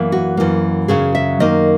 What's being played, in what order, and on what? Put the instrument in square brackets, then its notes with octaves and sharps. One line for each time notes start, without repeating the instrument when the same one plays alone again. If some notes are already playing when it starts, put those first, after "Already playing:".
Already playing: [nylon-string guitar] F#2 E3 A#3
F#4
F#2 E3 A#3
F#2 C#3 F#3 G#4
E5
F#2 D#3 A#3 D#5